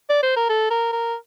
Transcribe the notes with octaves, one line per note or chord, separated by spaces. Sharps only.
D5
C5
A#4
A4
A#4
A#4